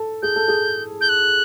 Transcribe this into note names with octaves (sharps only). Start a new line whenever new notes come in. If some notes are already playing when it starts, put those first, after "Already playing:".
Already playing: A4
G#4 G6
A4
G#4
G6
F#6